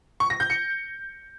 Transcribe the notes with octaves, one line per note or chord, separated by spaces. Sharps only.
C#6
A#6
G6
C#7